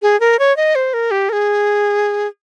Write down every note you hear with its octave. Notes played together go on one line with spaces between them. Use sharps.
G#4
A#4
C#5
D#5
C5
A#4
G4
A#4
G#4